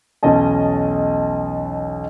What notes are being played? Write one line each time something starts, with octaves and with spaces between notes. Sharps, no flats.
B1 E2 C#4 D#5 A5